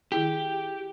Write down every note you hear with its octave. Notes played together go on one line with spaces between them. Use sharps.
D#3 E4 G4 G#4